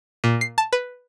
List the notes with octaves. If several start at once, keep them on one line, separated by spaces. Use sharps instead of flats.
A#2
C7
A5
B4